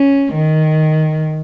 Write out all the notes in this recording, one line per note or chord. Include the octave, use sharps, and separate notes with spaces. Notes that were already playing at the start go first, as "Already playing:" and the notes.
Already playing: C#4
D#3